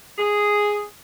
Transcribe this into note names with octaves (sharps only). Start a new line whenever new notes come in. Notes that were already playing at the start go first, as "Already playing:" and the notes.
G#4